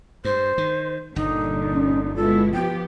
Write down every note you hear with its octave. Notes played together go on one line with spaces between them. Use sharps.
G2 C5
D#3
G1 A#2 D3 G3 D#4
C#4
B2 G#3 E4 F4 A4
F3 B3 G4 G5